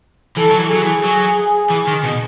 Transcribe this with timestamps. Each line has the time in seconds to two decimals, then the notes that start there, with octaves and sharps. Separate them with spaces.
0.37 E3 A4
0.51 F#3
0.59 E3
0.70 F#3 G#4
0.82 E3
1.04 F#3
1.71 E3
1.88 D#3
2.04 B2